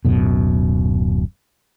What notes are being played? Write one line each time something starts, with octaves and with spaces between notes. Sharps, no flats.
D1 F#2 B2